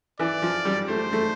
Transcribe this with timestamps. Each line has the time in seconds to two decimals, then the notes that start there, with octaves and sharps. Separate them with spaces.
0.19 E3 D5
0.42 F3
0.65 G3
0.88 A3 C5
1.13 A3